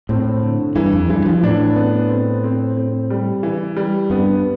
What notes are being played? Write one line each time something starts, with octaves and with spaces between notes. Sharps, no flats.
A2 C4
D3
G2 E3
F2
G2 E3
F3
A2 D4
B3
C4
C4
C4
G3
E3
G3
G2 B3